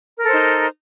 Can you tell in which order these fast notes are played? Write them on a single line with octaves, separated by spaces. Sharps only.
A#4 A4 C5 D#4